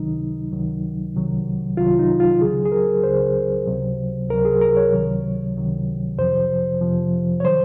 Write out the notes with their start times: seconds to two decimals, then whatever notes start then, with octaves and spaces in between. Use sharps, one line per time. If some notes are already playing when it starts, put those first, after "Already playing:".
Already playing: C#2 C3 D#3 F#3 D#4
0.52 C#2 C3 D#3 F#3
1.15 C2 C3 D#3 F#3
1.77 C2 C3 D#3 F#3 F4
1.99 D#4
2.20 F4
2.41 C#2 C#3 F#3 G#4
2.65 G#4
2.72 A#4
3.03 C#2 C#3 F#3 C5
3.67 C#2 C3 F#3
4.29 C#2 C3 F#3 A#4
4.45 G#4
4.61 A#4
4.77 C#5
4.93 C#2 C3 D#3 F#3
5.55 C#2 C3 D#3 F#3
6.18 F2 C3 F3 C5
6.81 F2 C3 F3
7.40 C#5
7.44 D#3 F#3 C5